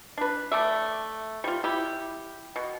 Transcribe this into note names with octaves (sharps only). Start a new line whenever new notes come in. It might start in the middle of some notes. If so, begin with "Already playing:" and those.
D4 B4
A3 D5 E5
G3 F4
E4 G4
B2